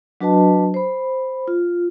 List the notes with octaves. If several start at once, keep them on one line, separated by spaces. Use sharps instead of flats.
F#3 D4 F#4 B4 D#5 A5
C5 B5
F4